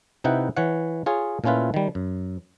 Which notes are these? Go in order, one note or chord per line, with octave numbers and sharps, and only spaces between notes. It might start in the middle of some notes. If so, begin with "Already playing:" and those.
C3 D#4 E4 B4 F#5 G5
E3 C#5 F#5
F4 G#4 C#5
A#2 A3 C#4 E4 F4 B4
D#3 G3
F#2